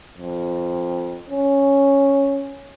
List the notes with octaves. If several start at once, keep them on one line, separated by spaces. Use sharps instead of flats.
F2
C#4